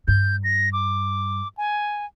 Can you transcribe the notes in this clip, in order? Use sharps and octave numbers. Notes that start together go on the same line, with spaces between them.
G2 G6
A#6
D6
G#5